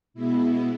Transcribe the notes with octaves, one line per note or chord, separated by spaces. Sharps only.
B2 G#3 B3 E4